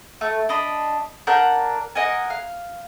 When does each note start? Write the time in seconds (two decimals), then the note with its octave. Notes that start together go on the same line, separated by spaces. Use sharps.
0.21 A3
0.49 D4 D#5 B5
1.27 D4 A#4 F#5 G6
1.95 A#4 D#5 F#5 G#5
2.30 F5